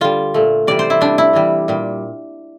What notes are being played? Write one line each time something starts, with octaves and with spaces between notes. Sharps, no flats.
D3 G3 F4
A#2 A3
C3 E3 G3 D5
C5
E4
C3 G3 D4
E4
C3 E3 G3
A#2 G3